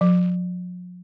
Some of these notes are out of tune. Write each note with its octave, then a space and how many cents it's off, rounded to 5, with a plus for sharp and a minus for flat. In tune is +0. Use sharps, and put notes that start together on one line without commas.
F3 +45